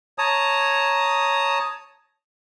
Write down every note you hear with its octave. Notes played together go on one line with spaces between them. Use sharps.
C#5 A5 A#5 D#6